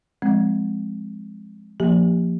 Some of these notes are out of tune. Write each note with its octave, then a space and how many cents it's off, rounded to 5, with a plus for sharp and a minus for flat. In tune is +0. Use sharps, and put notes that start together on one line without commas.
F3 +0 G#3 +0 C4 +0
F3 +5 A#3 +0 G4 +5